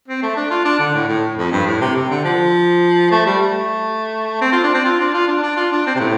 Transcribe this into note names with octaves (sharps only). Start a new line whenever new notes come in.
C4
A3
D4
F4
D4
D3
A2
A2
F2
G2
A2
C3
C3
D3
F3
A3
G3
A3
C4
F4
D4
C4
F4
D4
F4
D4
D4
F4
D4
C4
C3
A2